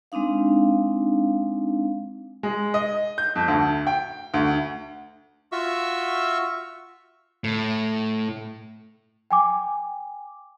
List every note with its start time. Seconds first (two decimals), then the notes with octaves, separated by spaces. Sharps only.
0.12 G#3 C4 D4 D#4 F5
2.43 G#3
2.74 D#5
3.18 G6
3.35 F2
3.48 D2
3.87 G5
4.34 D2
5.52 F4 F#4 E5 C#6 E6
7.44 A2
9.31 G5 G#5 D6